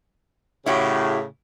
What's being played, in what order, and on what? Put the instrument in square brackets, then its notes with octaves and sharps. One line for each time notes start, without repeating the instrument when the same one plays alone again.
[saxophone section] A2 C#3 [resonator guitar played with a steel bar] E4 F#4 G4